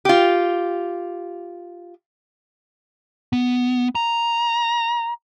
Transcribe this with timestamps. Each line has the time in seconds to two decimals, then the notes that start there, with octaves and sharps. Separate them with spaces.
0.05 F4 G4
3.33 B3
3.95 A#5